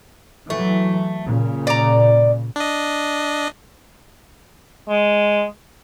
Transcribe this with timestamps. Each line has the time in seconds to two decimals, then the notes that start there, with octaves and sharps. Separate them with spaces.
0.50 E3 F#3 A3
1.25 A#2 C#3
1.67 D5 A#5
2.56 D4 D#5
4.89 G#3